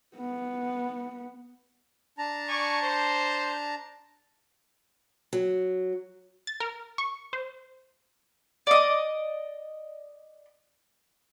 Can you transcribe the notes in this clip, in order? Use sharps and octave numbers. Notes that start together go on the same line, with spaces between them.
B3
D4 A5 A#5
D5 G#5 C#6
C5
F#3
A6
A#4
C#6
C5
D5 D#5